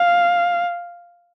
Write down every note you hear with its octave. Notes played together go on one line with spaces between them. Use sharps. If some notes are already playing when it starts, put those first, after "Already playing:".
Already playing: F5